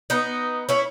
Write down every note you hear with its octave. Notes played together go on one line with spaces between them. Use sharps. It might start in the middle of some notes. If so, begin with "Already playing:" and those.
B3 D#4
C#4 E4